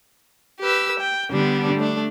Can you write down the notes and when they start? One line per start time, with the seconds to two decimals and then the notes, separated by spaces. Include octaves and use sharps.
0.61 G4 B4 E6
1.00 G5
1.31 D3 G3 B3 D4
1.76 A3 D4